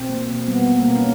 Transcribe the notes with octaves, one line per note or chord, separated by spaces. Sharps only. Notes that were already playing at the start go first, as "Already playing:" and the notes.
Already playing: B2 C4
A#3
A#3
G3 B3
G3
A#3
B2
C#4